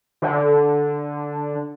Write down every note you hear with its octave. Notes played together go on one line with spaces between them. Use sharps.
D3